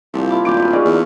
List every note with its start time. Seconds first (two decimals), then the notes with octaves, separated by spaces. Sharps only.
0.14 C2 A#2 F3
0.30 F3 E4 D6
0.45 D1 D4 G5 D6 D7
0.58 F#2 D5 G#5 B5
0.71 C#4 D#4 F#4 G#4 D5 F5
0.85 E2